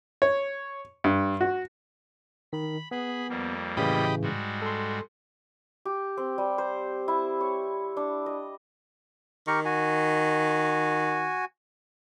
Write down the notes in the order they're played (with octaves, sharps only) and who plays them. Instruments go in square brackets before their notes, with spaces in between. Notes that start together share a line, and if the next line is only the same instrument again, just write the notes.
[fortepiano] C#5
G2
F#4
[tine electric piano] D#3 [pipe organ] B5
[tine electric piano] B3 [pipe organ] G#4 B5
[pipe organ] F2 G3 A#3
[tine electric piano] A2 C#3 E3 [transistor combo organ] G4 D#5 B5
[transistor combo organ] G#2 [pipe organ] G3 G#3 F#4
[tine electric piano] A4 C6
[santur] G4
C4
G3
C5
E4
C#5
D4
D#5
[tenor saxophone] D#3 [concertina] G4 A#4 C#6
[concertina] F#4 G#5